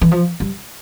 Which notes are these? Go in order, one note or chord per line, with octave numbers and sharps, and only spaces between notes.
E3
F3
G3